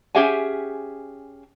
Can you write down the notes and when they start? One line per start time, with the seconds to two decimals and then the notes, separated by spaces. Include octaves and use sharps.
0.15 C#4 G4 G#4 E5 F#5 G#5